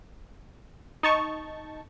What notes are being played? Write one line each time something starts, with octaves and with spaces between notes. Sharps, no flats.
D#4 A5 C#6